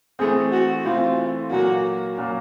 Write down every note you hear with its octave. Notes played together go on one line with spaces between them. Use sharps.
E3 A3 C4 G#4
F#4
E3 A3 C4 F4
A#2 F#3 A#3 F#4
A#2 F#3 A#3